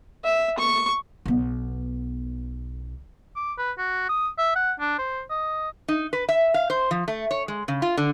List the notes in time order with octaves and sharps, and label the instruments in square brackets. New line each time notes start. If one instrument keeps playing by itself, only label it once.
[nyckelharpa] E5
C#6
[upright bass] B1 B3
[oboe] D6
B4
F#4
D#6
E5
F#5
D4
C5
D#5
[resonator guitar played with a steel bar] D#4
B4
E5
F5
C5
F3
A3
C#5
G#3
C#3
F4
D3